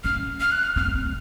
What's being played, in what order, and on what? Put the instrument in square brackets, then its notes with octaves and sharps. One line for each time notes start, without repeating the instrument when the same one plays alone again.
[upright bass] C#4 [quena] F6
[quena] F6
F#6
F6
[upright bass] C4 [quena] F6
[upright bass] C4